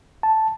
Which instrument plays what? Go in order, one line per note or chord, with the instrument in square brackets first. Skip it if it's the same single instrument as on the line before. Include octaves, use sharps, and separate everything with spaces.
[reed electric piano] A5